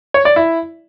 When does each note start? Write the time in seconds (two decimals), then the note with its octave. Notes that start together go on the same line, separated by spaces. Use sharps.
0.14 C#5
0.25 D5
0.36 E4